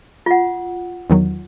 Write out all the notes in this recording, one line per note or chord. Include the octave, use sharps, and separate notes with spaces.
F4 F#5
E2 D#3 F#3